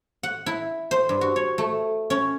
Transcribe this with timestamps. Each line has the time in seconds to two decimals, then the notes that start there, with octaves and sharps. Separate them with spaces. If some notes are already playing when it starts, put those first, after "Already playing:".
0.23 F#5
0.46 E4
0.91 C5
1.09 G2
1.21 F#4
1.36 C#5
1.58 A3
2.10 C#4